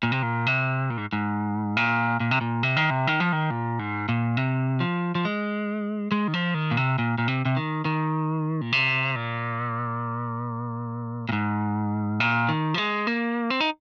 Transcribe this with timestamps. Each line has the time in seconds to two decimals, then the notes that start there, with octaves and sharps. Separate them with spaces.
0.03 A#2
0.12 C3
0.23 A#2
0.47 C3
0.90 A#2
0.97 G#2
1.13 G#2
1.77 A#2
2.20 A#2
2.31 C3
2.41 A#2
2.63 C3
2.76 D#3
2.90 C3
3.07 D#3
3.20 F3
3.33 D#3
3.51 A#2
3.79 G#2
4.09 A#2
4.37 C3
4.80 F3
5.15 F3
5.25 G#3
6.12 G#3
6.28 D#3
6.34 F3
6.54 D#3
6.71 A#2
6.77 C3
6.98 A#2
7.18 A#2
7.28 C3
7.45 C3
7.57 D#3
7.85 D#3
8.61 A#2
8.72 C3
9.16 A#2
11.29 A#2
11.32 G#2
12.20 A#2
12.49 D#3
12.74 F3
12.78 G#3
13.07 A#3
13.50 C4
13.61 D#4